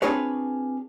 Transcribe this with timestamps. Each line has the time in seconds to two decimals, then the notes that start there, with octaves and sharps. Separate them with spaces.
0.02 C4 D4 F4 G#4 B4 C#5